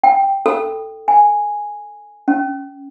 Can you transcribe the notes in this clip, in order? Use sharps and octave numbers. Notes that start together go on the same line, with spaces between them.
G5
A4
G#5
C#4